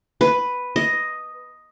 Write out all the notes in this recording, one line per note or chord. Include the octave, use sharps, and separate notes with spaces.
B4
D#5